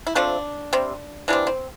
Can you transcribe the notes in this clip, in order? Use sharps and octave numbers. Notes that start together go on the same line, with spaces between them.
E4
F3 A3 C4 D4
C3 G3 C4
E3 G3 C4 D4
C4